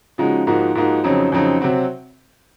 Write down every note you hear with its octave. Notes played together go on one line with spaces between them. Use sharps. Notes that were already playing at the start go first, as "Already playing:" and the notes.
C#3 F3 G#3 D#4 F#4
G#2 F3 A#3 D#4 F#4
G#2 F3 A#3 D#4 F#4
F2 C#3 F#3 C4 D#4
F2 C#3 F#3 C4 D#4
C3 F#3 C4 F#4